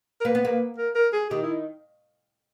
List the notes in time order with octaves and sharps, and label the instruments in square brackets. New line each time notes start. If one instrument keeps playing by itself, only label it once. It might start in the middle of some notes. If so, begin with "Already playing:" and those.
[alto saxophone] A#4
[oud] A#3 [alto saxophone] B4
[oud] B3
A#3
[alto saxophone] A#4
A#4
G#4
[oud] D#3 [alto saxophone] G4
[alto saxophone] E4